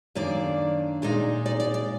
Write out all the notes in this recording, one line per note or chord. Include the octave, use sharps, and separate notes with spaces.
F#2 D#3 A#3 D4 D5
A#2 G#3 D#4 D5
D5
D5
D5